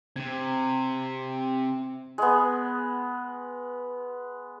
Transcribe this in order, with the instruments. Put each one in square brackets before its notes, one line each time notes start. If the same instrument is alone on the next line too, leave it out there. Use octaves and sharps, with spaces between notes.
[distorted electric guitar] C3 [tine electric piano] C4 G#6
[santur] G#3 B3